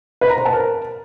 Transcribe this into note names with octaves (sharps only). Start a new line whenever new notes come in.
B4
A#5
C5
A5
A#4